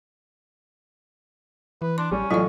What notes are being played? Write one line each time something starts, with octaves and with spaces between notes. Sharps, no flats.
E3 B4
D4 C6
A1 G3 C#4
A1 F#3 F4 D5 C#6